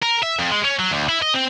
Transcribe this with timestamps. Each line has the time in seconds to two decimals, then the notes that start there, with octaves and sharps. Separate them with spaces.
0.02 A#4
0.23 E5
0.39 F2
0.51 G#3
0.64 C#4
0.79 F#3
0.91 D2
1.09 E4
1.22 D#5
1.34 C4